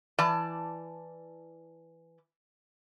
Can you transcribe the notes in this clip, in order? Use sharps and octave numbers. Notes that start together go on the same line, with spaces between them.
E3 D5 A5